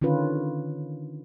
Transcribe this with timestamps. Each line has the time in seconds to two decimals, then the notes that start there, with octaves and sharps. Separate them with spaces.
0.02 D3 D#3 C#4 F4 B4